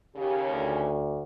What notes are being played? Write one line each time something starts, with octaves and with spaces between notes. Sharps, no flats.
D#2 C#3 G4
D2